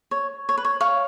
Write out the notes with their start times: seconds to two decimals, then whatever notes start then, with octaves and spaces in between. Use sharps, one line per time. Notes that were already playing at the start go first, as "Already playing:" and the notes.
0.11 C#5
0.49 C#5
0.58 B4
0.65 C#5
0.81 C#5 F5